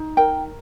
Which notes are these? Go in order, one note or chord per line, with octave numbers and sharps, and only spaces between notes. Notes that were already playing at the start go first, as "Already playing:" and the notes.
Already playing: D#4
A#4 G5